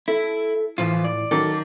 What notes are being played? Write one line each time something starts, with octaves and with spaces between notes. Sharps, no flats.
E4 A4
A2 E3 F3 F4
D5
D#3 F#3 A4 D6